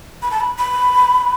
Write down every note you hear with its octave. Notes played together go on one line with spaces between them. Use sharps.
B5
A5
B5
B5